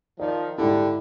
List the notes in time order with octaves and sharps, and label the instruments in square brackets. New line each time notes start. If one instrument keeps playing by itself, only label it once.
[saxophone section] D#3 [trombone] F3 [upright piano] D5
[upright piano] G#2 E4 [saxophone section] D3 [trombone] G4